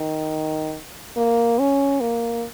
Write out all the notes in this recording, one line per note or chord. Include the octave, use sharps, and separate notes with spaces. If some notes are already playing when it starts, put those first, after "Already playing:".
Already playing: D#3
A#3
C#4
A#3